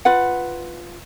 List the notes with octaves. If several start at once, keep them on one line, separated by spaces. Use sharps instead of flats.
F4 B4 F#5